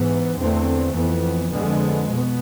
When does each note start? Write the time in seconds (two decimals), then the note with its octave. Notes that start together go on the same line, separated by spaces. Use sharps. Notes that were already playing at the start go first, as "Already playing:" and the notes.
Already playing: G#2 E3 B3
0.38 E2 D3 A3 C4
0.95 F2 E3 B3
1.53 F2 D3 G#3 B3
2.11 B2 B3